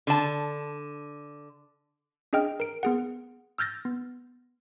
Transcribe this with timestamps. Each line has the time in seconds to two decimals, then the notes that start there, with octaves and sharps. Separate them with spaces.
0.07 D3 A5
2.33 C#4 D4 G#4 D#5 G5 F6
2.60 A#4 D7
2.83 B3 G#4 F#5
3.58 E6 F6 G6 A6 A#6
3.85 B3